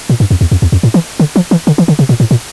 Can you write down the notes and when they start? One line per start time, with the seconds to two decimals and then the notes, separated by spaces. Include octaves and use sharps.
0.10 A#2
0.20 G2
0.31 F2
0.41 E2
0.51 F2
0.62 E2
0.72 F2
0.83 A2
0.94 E3
1.20 D3
1.36 F3
1.51 E3
1.67 D3
1.78 E3
1.88 D3
1.99 C3
2.09 A#2
2.20 A2
2.31 A#2